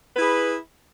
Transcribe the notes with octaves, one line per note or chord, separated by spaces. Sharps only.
E4 G#4 B4